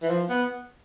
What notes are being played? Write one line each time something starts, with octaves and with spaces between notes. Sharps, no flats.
E3
F3
B3